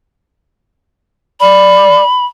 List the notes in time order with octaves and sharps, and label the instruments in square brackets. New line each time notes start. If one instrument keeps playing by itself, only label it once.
[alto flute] D5 [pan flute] B5